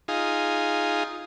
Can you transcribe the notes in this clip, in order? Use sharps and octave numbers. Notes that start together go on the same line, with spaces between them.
D#4 F4 G#4